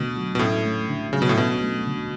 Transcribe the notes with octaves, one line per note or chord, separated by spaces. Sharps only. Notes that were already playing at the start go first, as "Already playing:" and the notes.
Already playing: B2 D3 A3
F#3
B2
A2 C#4
A3
D3
C#3 F#3
B2
A2
B2 C#4
A3
D3